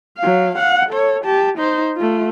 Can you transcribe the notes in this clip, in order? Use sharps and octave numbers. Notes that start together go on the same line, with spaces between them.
F#3 F5
F5 F#5
A4 C#5
G4 A5
D#4 C5
A3 F4